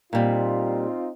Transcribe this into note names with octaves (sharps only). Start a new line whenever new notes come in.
A#2 G3 C4 D#4 F4